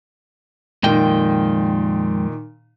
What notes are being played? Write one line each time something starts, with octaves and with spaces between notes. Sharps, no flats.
F2 A#2 D#3 G#3 G5